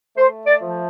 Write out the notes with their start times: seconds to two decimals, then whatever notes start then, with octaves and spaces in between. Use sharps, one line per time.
0.17 A3 C5
0.46 D5
0.61 F3